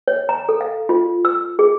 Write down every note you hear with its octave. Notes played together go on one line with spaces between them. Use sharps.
C#5
A#5
A4
F5
F4
E6
G#4